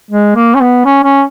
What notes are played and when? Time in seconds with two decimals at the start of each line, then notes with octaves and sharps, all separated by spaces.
0.11 G#3
0.36 A#3
0.55 C#4
0.61 B3
0.85 C#4
1.04 C#4